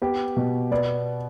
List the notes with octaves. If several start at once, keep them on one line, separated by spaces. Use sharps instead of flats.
B3 G4
B2
B3 D5